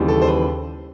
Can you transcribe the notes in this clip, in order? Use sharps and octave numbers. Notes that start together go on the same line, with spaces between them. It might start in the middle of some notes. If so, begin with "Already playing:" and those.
Already playing: D#2 C#3 E3 G3
A4
C5
B4